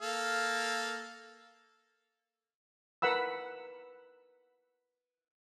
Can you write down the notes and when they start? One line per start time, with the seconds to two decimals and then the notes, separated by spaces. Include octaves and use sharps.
0.01 A#3 A4 F5
3.02 A#4 B4 F#5 B5 E6